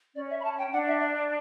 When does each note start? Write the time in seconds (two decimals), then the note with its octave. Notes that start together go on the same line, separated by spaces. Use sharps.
0.15 C#4 D5
0.30 E5
0.40 B5
0.44 A5
0.58 G5
0.72 D4 F#5
0.87 E5
1.01 D5